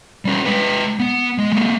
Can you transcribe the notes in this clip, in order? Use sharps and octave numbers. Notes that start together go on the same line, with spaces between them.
G3 C#4
G#3 B4
B3
G#3
G#3 A#3